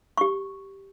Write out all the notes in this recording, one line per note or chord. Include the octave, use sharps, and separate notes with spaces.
G4 C#6